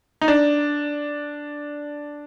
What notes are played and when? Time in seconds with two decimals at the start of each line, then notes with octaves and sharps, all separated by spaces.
0.21 D#4
0.28 D4